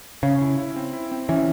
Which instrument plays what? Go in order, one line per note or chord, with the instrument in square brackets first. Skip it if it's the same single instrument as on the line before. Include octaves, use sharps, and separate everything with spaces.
[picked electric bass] C#3 [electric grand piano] C#4
[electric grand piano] E4
E4
C4
E4
C4
[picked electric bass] E3 [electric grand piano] C#4